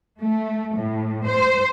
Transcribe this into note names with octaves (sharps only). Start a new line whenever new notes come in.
A3
A2
C5